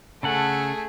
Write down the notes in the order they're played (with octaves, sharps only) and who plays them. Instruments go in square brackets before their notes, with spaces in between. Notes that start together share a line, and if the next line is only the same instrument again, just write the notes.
[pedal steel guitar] C#3 A4 F#5 [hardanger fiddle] A3 G#4